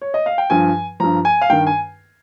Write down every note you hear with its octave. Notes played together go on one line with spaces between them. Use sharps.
C#5
D#5
F5
G5
G2 F3 G#5
G2 F3 A#5
G#5
F5
G2 D#3 G5
G#5